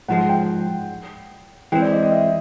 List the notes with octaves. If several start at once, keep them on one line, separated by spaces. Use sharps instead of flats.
G#2 F3 G#3 F#5
G5
E3 G#3 C4 G5
D5
D#5
D#5
E5